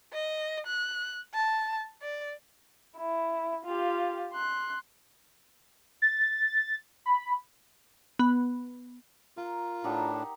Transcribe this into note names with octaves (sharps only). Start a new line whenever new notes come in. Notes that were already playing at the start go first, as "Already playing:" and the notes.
D#5
F#6
A5
D5
E4
F4 G4
C6 F#6
A6
B5
B3
F4 A#4
A2 D4 D#4 G4 F#5